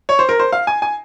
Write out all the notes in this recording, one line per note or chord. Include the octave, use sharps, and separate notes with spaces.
C#5
C5
A#4
C5
F5
G#5
G#5